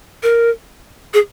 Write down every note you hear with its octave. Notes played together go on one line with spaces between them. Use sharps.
A#4
G#4